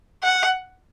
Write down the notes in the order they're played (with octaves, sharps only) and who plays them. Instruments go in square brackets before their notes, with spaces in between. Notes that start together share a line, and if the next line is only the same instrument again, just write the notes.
[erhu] F#5